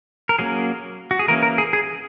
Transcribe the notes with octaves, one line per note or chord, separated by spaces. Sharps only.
A#4
F#3 A#3 C#4 G#4
F#4
G#4
E3 A#3 C#4 A#4
A#4
G#4
G#4